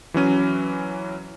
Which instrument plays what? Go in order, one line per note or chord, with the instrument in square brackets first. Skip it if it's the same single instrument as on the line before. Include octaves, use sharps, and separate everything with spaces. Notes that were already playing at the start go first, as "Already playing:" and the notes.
[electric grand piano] E3 F#3 C#4 D#7